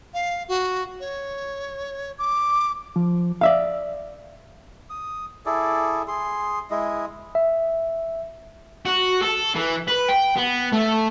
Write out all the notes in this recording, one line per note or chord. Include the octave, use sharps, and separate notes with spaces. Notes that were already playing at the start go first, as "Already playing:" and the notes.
F5
F#4
C#5
D6
F3
D5 E5 F5
D#6
E4 G#4 A4 D5
G#4 C6
G#3 E4 D#5
E5
F#4
A4
E3
B4
G5
B3
A3